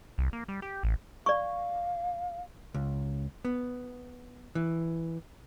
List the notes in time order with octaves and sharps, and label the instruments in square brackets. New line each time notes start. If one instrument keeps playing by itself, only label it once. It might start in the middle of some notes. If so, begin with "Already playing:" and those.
[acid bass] C2
A#3
G3
G4
A1
[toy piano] D5 C#6 [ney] F5
[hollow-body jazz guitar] C#2
B3
E3